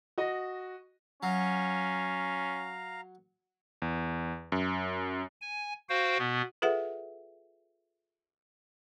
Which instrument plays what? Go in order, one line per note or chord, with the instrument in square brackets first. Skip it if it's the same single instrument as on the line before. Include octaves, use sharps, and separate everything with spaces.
[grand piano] F#4 D#5
[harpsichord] F#3 [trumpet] C#4 [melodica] F5 A#5
[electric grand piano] E2
F#2
[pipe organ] G#5
F#4 C5 F5 G5
B2 B3
[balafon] F4 G#4 A4 B4 E5 F#5